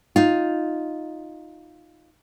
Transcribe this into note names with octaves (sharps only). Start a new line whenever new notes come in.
D#4 F4